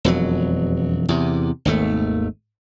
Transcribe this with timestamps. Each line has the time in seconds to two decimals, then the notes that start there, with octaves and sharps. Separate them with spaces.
0.05 E1 F2 F#3
1.09 E2 C3
1.65 G#1 D#2 A3